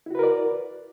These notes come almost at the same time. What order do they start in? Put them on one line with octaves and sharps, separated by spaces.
E4 F#4 B4 A#4 D5